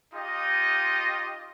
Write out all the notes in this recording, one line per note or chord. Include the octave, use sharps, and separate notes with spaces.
D#4 F4 G4 D#5